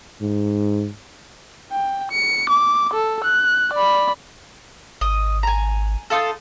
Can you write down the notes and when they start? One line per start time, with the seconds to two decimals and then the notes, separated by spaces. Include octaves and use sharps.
0.21 G#2
1.72 G5
2.12 C#7
2.50 D6
2.94 A4
3.25 F#6
3.74 D5 B5
5.01 G#1 D#5 D#6
5.43 G#5 A#5
6.10 D#4 F4 A4